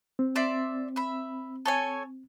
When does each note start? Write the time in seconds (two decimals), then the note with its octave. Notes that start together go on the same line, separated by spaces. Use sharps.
0.19 C4
0.36 D5 E5 C6
0.96 E5 B5
1.66 A4 C#5 G#5